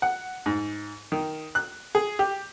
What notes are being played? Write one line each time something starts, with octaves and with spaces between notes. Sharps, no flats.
F#5
G#2
D#3
F#6
G#4
G4